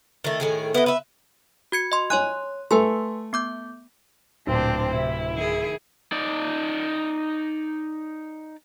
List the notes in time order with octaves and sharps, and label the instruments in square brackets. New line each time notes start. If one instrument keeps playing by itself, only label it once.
[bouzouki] D#3 A3
A2 D#3 G#4
[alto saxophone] B3 [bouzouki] E4 D#5
[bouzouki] B4 E5
[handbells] F#4 G#6 C#7
D#5 C6
[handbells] C#5 C6 F#6 [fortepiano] G#5
[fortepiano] A3 [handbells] B4 G#5 C6
[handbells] B3 D6 G6
[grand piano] D1 [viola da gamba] A#2 C5 [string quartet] C4 D4
[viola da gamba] C3 [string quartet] E4
[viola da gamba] D#3 G#4
[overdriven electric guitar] D#4 D5